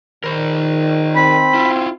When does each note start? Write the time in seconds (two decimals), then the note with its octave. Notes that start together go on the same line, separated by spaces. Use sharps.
0.24 D#3 A#4 C5
1.15 C4 B5
1.54 E4 F4